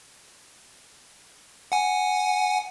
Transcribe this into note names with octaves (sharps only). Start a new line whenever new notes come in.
F#5 G#5